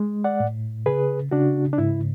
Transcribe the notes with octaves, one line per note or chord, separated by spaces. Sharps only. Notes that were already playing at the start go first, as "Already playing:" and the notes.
Already playing: G#3
D5 F#5
A2
C#3 G#4 B4
C#3 D4 F#4
D4
G#2 E4